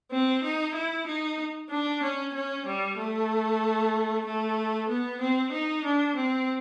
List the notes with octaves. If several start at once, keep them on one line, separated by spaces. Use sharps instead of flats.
C4
D#4
E4
D#4
D4
C#4
C#4
G3
A3
A3
B3
C4
D#4
D4
C4